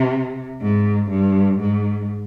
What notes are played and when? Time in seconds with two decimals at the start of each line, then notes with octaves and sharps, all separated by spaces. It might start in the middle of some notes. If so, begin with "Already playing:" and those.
Already playing: C3
0.62 G#2
1.11 G2
1.60 G#2